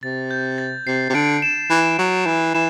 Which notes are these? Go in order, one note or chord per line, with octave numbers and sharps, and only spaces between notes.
C3 A6
G6
A6
C3 C7
C3
D3 D7
E7
E3
F#3
E3
E3 E7